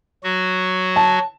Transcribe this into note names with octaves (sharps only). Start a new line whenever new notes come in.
F#3 F#4
A5